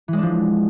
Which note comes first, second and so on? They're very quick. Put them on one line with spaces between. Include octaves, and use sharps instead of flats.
E3 G#3 D4 F3